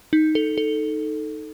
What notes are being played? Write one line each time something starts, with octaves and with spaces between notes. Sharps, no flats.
D#4
A4
A4